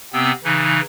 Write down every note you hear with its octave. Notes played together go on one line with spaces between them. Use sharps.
C3 B3 C4 E6
C#3 E3 D#4